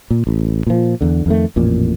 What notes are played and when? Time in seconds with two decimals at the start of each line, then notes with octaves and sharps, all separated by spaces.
0.11 A#2
0.27 A1
0.67 A#2 F3
1.01 E2 D3
1.26 F2 D#3 A3
1.56 A1 F2 A#2